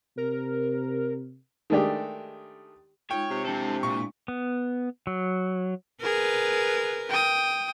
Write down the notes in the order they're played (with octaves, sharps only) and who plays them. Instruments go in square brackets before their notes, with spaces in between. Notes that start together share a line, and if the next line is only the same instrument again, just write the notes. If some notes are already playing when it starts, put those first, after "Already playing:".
[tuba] C3 [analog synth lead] A#4
[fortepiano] D#3 G#3 A3 D4 G4
[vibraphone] G#3 D#4 F4 [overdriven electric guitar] C#5 [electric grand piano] G5
[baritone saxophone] C3
[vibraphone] G#3 D4 E4 [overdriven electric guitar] C4 A4
[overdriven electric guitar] A#2 [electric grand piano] C#6
[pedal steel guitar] B3
F#3
[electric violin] G#4 [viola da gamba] A#4 B4
[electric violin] G5 D#6